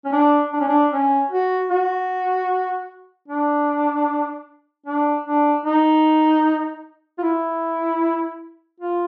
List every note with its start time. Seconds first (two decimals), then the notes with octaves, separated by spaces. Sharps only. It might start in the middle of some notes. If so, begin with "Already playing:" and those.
0.05 C#4
0.13 D4
0.53 D4
0.60 C#4
0.68 D4
0.92 C#4
1.31 F#4
1.70 F#4
3.28 D4
4.86 D4
5.25 D4
5.65 D#4
7.18 F4
7.23 E4
8.80 F4